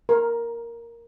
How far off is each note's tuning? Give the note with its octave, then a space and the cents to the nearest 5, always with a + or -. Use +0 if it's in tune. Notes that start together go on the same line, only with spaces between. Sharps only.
A#4 +0